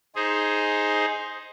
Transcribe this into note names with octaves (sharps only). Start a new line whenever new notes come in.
D#4 G#4 C5